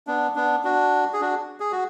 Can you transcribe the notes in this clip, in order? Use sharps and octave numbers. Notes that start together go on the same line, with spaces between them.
B3 D4
B3 D4
D4 F#4
G#4
D4 F#4
G#4
F#4